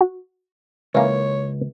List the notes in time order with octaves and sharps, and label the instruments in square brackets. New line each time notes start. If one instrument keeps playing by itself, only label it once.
[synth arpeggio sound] F#4
[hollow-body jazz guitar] C#2 [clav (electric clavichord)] E3 A#3 [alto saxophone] C#5